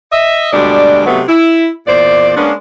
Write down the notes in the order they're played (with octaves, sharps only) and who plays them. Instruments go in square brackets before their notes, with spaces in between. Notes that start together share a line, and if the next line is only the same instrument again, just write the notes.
[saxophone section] D#5 E5
D2 B2 G3 G#3 D4 D5
C3 D#3 F#3 A3 B3
E4
E2 A#2 C5 D5
G#3 A#3 B3 C#4 D4